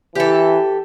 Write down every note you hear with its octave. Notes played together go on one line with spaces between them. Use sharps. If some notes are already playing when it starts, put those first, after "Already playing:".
E3 G4 A4